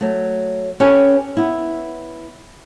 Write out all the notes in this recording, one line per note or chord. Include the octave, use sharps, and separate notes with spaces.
F#3 A3
C#4 G4 A4 B4 G#5
B3 E4